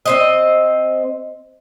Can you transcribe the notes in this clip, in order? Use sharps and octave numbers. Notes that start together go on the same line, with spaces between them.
C4 C5 D#5